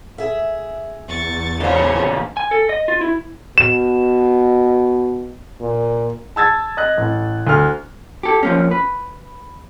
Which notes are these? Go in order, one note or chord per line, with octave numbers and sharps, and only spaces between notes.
G#4 E5
E2 C#6 A6
A#2 C#3 E3 D4 F4 C5 C#5
G#5
A4
D#5
F4
E4
B2 E7
A#2
A5 E6 G#6 A6
D#5 F#6
A1
D2 F6
G4 A4
F3 A#3 C#4
B4